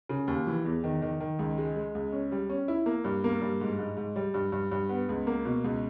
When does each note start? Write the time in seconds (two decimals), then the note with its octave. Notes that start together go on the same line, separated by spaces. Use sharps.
0.09 C#3
0.28 D#2
0.47 E3
0.65 E2
0.84 D#3
1.02 D#3
1.20 D#3
1.39 C#2
1.58 G#3
1.76 G#3
1.95 C#2
2.13 C#4
2.32 G3
2.49 C#4
2.68 E4
2.86 A#3
3.04 G2
3.24 A#3
3.41 G2
3.61 G#2
3.79 G#2
3.97 G#2
4.16 G3
4.34 G2
4.52 G2
4.71 G2
4.89 B3
5.09 C#2
5.27 A#3
5.45 B2
5.64 C#2